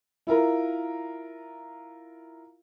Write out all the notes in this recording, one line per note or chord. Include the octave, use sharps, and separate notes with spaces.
E4 F4 A#4